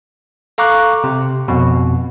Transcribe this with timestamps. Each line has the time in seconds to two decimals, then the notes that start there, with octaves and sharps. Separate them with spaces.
0.58 A4 F5 A#5 C#6 D6 F#6
1.04 C3
1.48 F2 B2